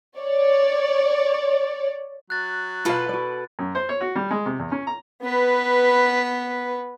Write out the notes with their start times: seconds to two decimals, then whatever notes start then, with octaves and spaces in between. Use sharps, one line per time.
0.19 C#5 D5
2.30 F#3 F#6 A6
2.85 B2 F4 A4 B4 F5
3.09 F#4 D5
3.59 F#2
3.75 C5
3.89 C#5
4.01 F#4
4.16 G3
4.31 G#3
4.46 C3
4.59 E2
4.72 C#4
4.87 A#5
5.23 B3 B4